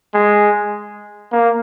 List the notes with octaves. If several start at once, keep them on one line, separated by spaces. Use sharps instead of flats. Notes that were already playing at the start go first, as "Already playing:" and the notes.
G#3
A#3